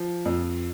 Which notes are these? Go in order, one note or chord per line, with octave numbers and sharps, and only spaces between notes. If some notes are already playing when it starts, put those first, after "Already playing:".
Already playing: F3
F2